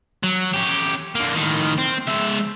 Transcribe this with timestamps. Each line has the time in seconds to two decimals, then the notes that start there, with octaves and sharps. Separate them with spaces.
0.24 F#3
0.54 C#4 G4
1.15 D3 A#3
1.34 A2 D#3
1.78 C4
2.08 G#3 E5